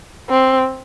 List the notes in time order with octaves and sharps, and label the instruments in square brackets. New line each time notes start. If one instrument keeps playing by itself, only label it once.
[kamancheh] C4